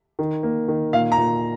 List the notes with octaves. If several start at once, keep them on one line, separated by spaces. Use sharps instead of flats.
D#3
A#3
D#3
A#2 F5
A#5
A#2